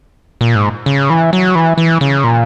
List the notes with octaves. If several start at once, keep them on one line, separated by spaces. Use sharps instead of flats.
A#2
G#2
C#3
E3
F#3
E3
E3
C#3
A#2